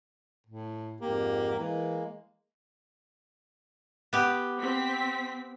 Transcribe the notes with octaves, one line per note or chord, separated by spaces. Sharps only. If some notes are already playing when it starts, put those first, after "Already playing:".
A2
F2 G#2 A#3 G4
E3 G#3 A#3
B3 G4
C4 B6